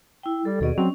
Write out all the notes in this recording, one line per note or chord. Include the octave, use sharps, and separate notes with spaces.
E4 G5
G3 A4
D#2 B2 G#4 D5 D#5
F#3 C4 C#4